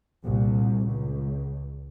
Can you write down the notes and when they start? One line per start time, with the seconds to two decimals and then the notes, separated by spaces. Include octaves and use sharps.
0.24 C2 A#2
0.88 C#2